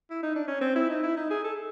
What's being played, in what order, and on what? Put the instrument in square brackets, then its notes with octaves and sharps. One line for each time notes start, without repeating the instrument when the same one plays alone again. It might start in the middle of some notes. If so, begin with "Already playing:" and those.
[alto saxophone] E4
D#4
D4
C#4
C4
E4
D#4
E4
D#4
G#4
A4